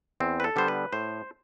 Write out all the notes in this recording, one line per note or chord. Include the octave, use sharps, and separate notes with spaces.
E2 C4
B4
A4
D3 G3 B3 C5
B4
A2 C5